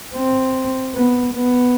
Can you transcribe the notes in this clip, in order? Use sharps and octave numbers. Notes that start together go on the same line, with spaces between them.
C4
B3
B3